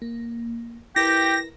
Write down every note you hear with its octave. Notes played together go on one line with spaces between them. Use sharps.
A#3
E4 G4 A#4 B4 G5 A#6